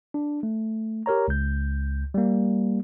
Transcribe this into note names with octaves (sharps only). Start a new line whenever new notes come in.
D4
A3
G4 A#4 C#5 A#5
C#2 G6
G3 A#3